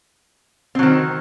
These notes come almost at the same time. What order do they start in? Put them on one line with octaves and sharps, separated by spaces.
C4 F#3 D#3